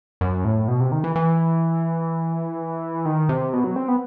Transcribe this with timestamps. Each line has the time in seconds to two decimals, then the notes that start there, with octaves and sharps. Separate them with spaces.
0.21 F#2
0.45 A2
0.68 B2
0.80 C3
0.92 D#3
1.04 E3
1.16 E3
3.05 D#3
3.29 C3
3.53 B2
3.64 F#3
3.76 C4
3.88 B3